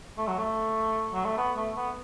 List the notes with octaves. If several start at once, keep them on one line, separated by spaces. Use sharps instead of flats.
A3
F#3
A3
F#3
A3
B3
A3
B3